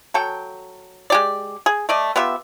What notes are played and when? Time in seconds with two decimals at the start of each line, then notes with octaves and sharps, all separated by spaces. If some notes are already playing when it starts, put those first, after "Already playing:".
0.14 F#3 A4 G5
1.10 G#3 G4 D5
1.66 G#4
1.89 A3 D5 D#5
2.16 B3 F4 G4 E5